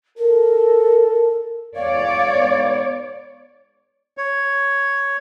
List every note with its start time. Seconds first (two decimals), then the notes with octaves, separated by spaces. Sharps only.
0.18 A4 A#4
1.76 E2 C#5 D5 F5
2.35 G#2 G#3 B3
4.17 C#5